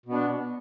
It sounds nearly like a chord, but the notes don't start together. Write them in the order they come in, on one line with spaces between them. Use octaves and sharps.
B2 B3 D4